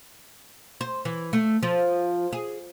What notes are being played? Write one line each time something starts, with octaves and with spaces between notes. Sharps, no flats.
C5
E3
A3
F3
G#4